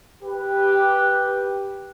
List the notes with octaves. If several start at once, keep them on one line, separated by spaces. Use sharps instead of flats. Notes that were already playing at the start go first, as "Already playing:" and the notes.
G4 B4